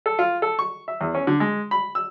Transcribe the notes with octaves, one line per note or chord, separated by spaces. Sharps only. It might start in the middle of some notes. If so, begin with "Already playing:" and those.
A4
F4
A4
C#6
E5
E2
C#4
D3
G#3
B5
E6